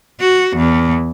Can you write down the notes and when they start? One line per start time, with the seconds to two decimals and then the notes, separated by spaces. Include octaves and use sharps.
0.20 F#4
0.57 E2